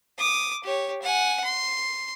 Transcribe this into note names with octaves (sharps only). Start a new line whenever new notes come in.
D6 D#6
G4 C#5
F#5 G#5
C6